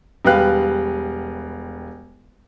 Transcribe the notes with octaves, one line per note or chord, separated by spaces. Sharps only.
E1 G3 G4 B4 F5 F#6